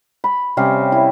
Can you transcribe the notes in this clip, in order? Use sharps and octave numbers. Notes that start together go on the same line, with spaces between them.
B5
C3 G3 C#4 F5
E4 C#5